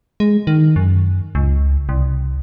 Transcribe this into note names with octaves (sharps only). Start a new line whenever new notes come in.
G#3
D#3
F#2
C#2
C2